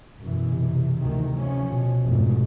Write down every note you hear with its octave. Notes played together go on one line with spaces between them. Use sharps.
F#2 B2 E3
C3
D2 D#3 E3
F3 C#4
B2
F1 G#2